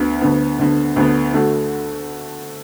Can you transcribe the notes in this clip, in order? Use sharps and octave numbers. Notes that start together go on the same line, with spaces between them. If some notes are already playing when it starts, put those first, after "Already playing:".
Already playing: D2 D3 B3
D2 D3 B3
D2 D3 B3
D2 D3 B3
D3 A3 F#4